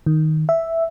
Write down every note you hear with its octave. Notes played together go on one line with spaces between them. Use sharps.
D#3
E5